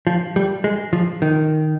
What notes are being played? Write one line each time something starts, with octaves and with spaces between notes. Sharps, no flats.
F3
G3
G#3
F3
D#3